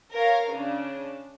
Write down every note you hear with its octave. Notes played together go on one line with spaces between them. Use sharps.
A#4 C#5 F5
C#3 D4